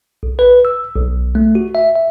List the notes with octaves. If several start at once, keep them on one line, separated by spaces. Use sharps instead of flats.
B1
B4
E6
B1
A3
F#4
E5
E5